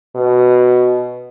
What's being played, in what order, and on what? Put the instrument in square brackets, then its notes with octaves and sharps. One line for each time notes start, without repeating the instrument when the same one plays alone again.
[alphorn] B2